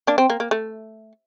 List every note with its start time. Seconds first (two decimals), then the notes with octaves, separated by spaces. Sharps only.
0.07 A#3 D4
0.18 C4
0.30 A#3
0.40 A#3
0.51 A3